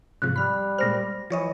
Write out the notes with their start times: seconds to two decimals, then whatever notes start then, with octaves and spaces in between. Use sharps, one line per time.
0.22 G#2 C3 F3 F#6
0.36 G3 B5 F6
0.78 A#2 G#3 C5 F6 A#6
1.30 E3 F3 C#5 D#5